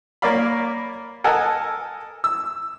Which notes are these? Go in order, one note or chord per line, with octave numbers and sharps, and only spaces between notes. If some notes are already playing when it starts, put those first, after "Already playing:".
A#3 C#5 D5 F5 B5
A4 A#4 D#5 F#5 G#5 A5
E6